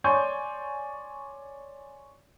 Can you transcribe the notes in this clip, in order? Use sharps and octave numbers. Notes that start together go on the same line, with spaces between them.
C#5 D5 G#5 C6 C#6 G6